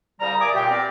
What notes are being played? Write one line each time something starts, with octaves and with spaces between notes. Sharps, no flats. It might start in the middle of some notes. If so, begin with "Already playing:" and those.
C2 C#3 G3 A#5
A#4 D5 E5 G#5 D6 D#6
A#2 G4 G5
B3 C4 G4 A#4 D5